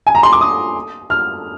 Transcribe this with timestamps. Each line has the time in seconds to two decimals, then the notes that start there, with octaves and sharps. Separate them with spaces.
0.07 G#5
0.15 A#5
0.23 C6
0.32 D6
0.41 D#6
1.10 F6